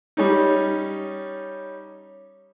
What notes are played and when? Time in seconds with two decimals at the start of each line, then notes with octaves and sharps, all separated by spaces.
0.17 G3 C#4 D#4